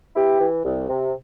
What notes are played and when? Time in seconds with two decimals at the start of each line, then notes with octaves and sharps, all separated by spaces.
0.15 B3 E4 G4
0.40 E3
0.64 C2
0.88 C3